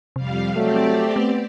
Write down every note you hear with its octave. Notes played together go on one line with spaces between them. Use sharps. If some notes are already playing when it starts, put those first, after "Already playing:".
F2 C3 G3 F5
F#3 A3 C4 G4 D5
A3 B3